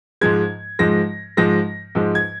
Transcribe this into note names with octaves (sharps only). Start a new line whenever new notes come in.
G#2 F3 G#3 G#6
G#2 F3 G#3 A#6
G#2 F3 G#3 A#6
G#2 F3 G#3
G#6